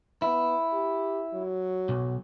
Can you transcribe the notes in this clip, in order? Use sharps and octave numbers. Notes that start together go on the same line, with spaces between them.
B3 E4
G4
F#3
B1